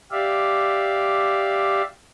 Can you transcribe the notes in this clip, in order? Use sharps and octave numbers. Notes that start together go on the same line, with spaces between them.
G4 D5 E5 F5